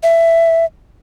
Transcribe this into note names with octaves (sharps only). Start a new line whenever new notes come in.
E5